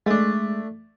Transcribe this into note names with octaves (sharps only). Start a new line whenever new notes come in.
G#3 A3 D4